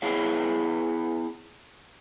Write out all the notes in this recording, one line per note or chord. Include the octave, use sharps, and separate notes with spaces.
B3 E4 G#4 C#5 F5